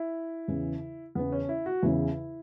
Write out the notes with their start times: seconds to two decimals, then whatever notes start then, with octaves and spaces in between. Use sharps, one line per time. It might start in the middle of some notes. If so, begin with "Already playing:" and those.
Already playing: E4
0.48 E2 C#3 E3
1.15 E2 C#3 E3 B3
1.32 C#4
1.49 E4
1.66 F#4
1.82 E2 C#3 E3 E4